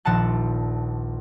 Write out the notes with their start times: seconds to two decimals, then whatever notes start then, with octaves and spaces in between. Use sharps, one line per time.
0.05 D#1 A#1 F#5 A5 F#6